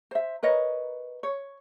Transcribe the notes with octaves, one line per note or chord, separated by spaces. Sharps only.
C5 E5
A#4 B4 C#5 D#5
C#5